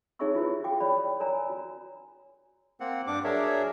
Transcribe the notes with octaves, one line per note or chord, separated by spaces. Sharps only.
D#4 G#4 C#5 E5 C#6 E6
E4 F4 G4 B4 C5 E5
F#4 G#4 F5 G5 D6
B4 C#5 D5 G5 B5
A#4 C#5 D5 G#5 A#5
F#4
A#3 C4 F#5
G2 D4 D6
F#3 D4 G#4 A#4 C#5 E5